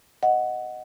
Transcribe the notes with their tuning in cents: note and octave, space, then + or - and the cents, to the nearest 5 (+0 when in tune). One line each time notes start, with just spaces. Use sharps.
D#5 +0 F#5 +0